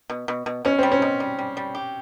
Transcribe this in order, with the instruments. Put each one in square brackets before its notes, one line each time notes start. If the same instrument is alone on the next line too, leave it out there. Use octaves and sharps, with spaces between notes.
[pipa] B2
B2
B2
[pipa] B2 [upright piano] C#4
[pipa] G3 [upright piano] C4
[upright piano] C#4
[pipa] B2
G3
G3
G3
G4